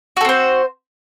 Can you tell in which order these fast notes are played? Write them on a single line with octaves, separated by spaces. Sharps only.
F#4 A4 C4 C5